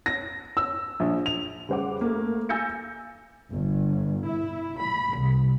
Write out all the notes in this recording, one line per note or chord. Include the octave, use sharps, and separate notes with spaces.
A#6
E6
A#1
F7
C#3 G3 C5 F#5 D6
A3 A#3
G#5 E6 G6 A6 A#6 C#7
G1
E4
B5
C2